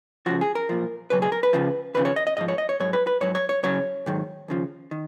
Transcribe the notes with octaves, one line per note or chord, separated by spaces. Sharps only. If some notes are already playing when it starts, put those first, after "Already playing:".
C#2 C#3 F3 F#4
G#4
A#4
B1 A#2 F3
C#2 B2 F#3 B4
G#4
A#4
B4
C#2 C#3 F3
D#2 C#3 F3 B4
C#5
D#5
D#5
G#2 F3 D#5
C#5
D#5
C#5
G#2 F#3 C#5
B4
B4
G#2 F#3 C#5
C#5
C#5
F#2 C#3 F#3 C#5
G#2 D#3 F#3
D#2 C#3 F3
D#3